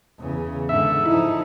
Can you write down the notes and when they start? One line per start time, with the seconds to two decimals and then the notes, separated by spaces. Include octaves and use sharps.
0.20 E2 C#3
0.69 G#2 D3 E5
1.06 F3 D#4 E4